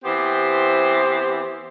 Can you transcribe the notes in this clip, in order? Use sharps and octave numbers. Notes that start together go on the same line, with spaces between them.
E3 B3 C4 G4 C5